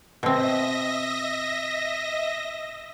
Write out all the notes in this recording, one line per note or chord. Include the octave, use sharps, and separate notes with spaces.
B2 C4 D#5 E5 A#6